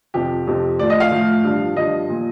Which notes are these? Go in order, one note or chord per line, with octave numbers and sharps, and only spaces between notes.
F2 C3 F3 G4
F2 C3 F3
A2 F3 D5
D#5
F5
A2 F3
G2 F3
G2 F3 D#5
A#2 F3